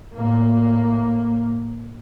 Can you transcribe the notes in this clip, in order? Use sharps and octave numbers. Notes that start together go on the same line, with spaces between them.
A2 A#3